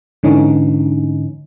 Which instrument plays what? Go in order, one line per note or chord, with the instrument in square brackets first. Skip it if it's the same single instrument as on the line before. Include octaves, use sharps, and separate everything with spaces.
[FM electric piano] G#2 D3 E3 C#4 D#4